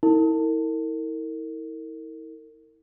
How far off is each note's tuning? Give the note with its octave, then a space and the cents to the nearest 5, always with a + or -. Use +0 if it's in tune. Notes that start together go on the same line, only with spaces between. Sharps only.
E4 -40 A#4 -35